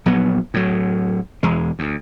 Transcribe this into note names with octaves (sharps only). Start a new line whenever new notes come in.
A#1 F#3 B3
A2 F#3
E1 E2 G#3
D2